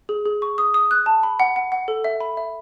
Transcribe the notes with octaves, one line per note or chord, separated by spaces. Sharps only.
G#4
G#4
C#6
D#6
D#6
F#6
A5
B5
F#5
F#5
F#5
A4
E5
B5
E5